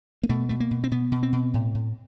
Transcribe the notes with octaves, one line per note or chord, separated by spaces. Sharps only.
A#3
B2 A3
B2 A3
A#3
B2
C4
B2 B3
B2
C4
B2
A2
A2